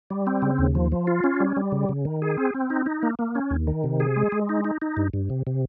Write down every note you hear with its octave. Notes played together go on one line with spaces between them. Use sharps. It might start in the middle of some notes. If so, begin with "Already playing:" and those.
G3
C4
C#3
D#2
F3
F3
F4
C#4
G3
G3
C#3
C#3
D#3
G#4
C4
C4
D#4
D#4
A#3
A#3
C#4
D#2
D#3
C3
G#4
G#3
G#3
D#4
D#4
D#4
G2
G2
C3
C3